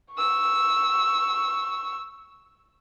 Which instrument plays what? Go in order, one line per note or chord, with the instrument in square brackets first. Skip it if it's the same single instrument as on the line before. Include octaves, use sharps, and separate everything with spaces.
[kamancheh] C#6 E6